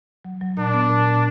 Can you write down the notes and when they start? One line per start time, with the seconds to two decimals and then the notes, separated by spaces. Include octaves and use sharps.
0.25 F#3
0.41 F#3
0.57 A#2 D4
0.73 B3
0.90 A#2
1.07 A#2